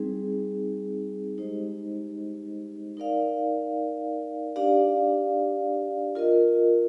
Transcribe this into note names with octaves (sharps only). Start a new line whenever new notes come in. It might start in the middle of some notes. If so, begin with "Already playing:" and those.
Already playing: G3 C4 D#4 G#4
G#3 D#4 G4 C5 D#5
D#4 A#4 D5 F5
D4 G4 D5 F5
F4 A#4 D#5